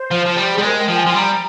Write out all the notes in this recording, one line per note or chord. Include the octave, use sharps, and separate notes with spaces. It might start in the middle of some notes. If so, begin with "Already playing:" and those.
Already playing: C5
F3
F3
G3
G#4
G3
G#3 A#4
G5
F3
G#5
F3 C6
G3 A#5